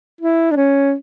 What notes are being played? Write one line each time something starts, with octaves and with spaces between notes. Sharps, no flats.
E4
D4
C#4